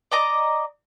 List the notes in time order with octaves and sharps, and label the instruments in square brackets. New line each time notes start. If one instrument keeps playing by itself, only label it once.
[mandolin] D5 D#5 A#5 D6